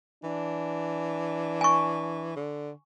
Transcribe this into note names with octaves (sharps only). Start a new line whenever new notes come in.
E3 D4
G#5 C#6
D3